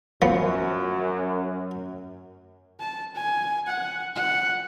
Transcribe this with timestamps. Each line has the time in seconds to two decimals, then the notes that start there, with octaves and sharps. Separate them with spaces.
0.22 F#2 F3 B3
2.80 A5
3.15 G#5
3.67 F#5
4.16 F#5